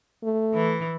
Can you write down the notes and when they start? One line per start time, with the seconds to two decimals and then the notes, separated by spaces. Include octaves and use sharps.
0.24 A3
0.54 E3